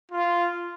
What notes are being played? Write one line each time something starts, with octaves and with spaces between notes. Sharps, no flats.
F4